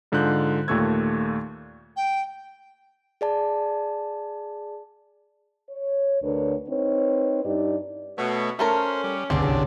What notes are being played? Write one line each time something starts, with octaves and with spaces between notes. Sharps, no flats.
G#2 D3 G#3 F4 F#6 G6
D#2 A#2 A3 C#6 E6 G#6
G5
G#4 D5 A5
C#5
D2 D3 A#4 B4 C#5
C4 D#4 B4 C#5
G2 D#4 E4 G4 D5
B2 A3 C#5
A3 C#4 A4 A#4 C5
G3
G1 C#2 C3 C4 D4
C2